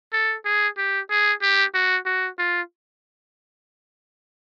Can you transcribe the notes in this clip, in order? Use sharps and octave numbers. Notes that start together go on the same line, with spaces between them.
A4
G#4
G4
G#4
G4
F#4
F#4
F4